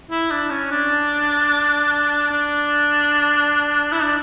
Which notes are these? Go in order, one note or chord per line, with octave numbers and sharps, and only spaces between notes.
E4
D4
C#4
D4
D4
E4
D4